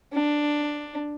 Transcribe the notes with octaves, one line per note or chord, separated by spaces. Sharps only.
D4